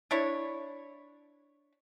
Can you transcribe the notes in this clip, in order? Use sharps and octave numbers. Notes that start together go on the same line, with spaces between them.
D4 E4 C#5